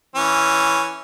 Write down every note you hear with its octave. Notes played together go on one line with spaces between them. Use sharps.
E3 C#4